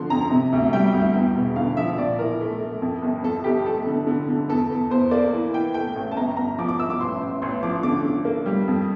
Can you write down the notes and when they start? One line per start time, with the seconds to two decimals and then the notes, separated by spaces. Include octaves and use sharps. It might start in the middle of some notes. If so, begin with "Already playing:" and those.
Already playing: D3 F3 C6
0.10 F2 A#5
0.31 C3
0.53 D2
0.73 G3 G5
0.93 D2
1.15 E2
1.36 E1
1.56 D3 F5
1.77 F3 E5
1.98 A#1 D5
2.19 E3 A#4
2.41 A3
2.61 A3
2.82 F2
3.02 G1
3.23 F2 A4
3.44 G1 G4
3.65 A3 A4
3.87 D3
4.07 D3
4.29 D3
4.49 E2 A4
4.70 E2
4.90 E2 C5
5.11 A#3 D5
5.33 E3
5.53 E3 G5
5.74 A3 G5
5.96 A1
6.11 A5
6.17 G1 A#5
6.37 G1 A#5
6.58 F3 D6
6.69 D6
6.78 G1 E6
6.90 D6
7.00 A1 C6
7.21 A1
7.42 A1 C6
7.63 F3 D6
7.83 D3 D6
8.05 D3
8.25 A#3
8.46 G3
8.68 F2